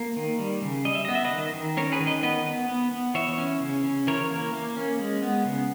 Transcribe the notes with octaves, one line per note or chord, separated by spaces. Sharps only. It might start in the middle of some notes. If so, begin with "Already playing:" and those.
Already playing: A#3
D#3
G3
C#3
G3 D#5
E5
B3 D#5
E5
B4 D#5
D#3
D#3
C#4 A#4 C#5
G#4 B4
D#3
B4 D#5
B3 B4 D#5
B3
B3
B3
E3 C#5 E5
C#4
C#3
C#4
E3 A#4 C#5
A#3
A#3
C#4
G#3
B3
C#3